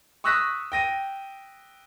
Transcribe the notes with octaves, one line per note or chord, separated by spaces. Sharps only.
C#6 D#6 E6 F#6 A#6 B6
G5 A#6 D#7